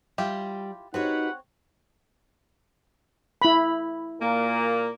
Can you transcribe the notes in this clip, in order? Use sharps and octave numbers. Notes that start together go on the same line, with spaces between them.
G3 E4 F4 G4
C4 D#4 F#4 G4 B4 C#5 F#5
E4 B5
A#2 A#3